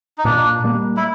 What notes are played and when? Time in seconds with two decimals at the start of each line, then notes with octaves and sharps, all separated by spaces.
0.18 D#4
0.25 A#2 D4
0.64 G3 A#3
0.97 E4